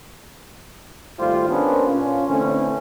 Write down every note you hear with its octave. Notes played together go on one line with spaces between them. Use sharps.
G#1 G3 A3 F4 G4 C5
A#3 B3 C#4 D4 C5
A#2 C#4 F4
D3 E3 A3 C4 C#4